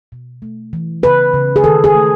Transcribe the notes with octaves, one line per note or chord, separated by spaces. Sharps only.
B2
A3
E3
C#3 B4
C#3
G#4
D#3 A4
G#4
A3